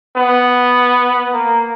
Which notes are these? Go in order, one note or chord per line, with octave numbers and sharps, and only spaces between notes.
B3
A#3